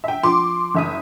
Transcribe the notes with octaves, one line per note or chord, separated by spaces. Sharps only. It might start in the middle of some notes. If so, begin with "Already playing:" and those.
E5 G5
F3 C6 D6
F#1 E5 D#6